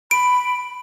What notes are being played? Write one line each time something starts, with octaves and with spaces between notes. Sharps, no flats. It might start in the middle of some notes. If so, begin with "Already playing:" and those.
B5 D7